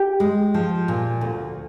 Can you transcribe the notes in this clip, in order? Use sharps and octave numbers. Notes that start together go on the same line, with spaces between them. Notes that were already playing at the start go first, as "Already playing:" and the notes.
Already playing: G4
G#3
F3
A#2
D2